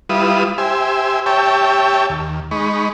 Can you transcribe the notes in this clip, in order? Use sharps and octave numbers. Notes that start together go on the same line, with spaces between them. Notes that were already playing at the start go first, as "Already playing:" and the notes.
G3 E4 F4 B4 D#6
G4 C5 E5 G#5
G4 C#5 E5 G5 A5
D#2
G#3 D#4 B5 C#6